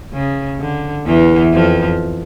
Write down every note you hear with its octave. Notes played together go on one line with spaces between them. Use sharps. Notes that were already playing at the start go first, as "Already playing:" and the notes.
C#3
D3
E2 E3
F2 F3